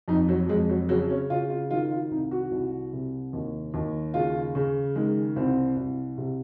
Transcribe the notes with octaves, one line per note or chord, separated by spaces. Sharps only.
F2 D#4
F#3
F2 G#3
F#3
C#3 F#3
C#4
C#3 F4
F4
D#3 F4
F4
C2 D#4
F#4
C2
C3
D#2
D#2
C#3 F4
C#3
D#3 G#3
C2 C4
C2
C3